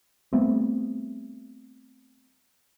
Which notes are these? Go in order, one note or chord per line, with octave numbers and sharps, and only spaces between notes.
G3 A3 B3 C4